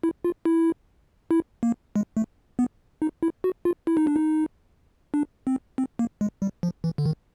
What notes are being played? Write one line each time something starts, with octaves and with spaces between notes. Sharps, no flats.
E4
F4
E4
E4
A#3
G#3
A3
B3
D#4
E4
F#4
F4
E4
D#4
D4
D#4
D4
C4
C4
A#3
G#3
G3
F3
E3
D3
D#3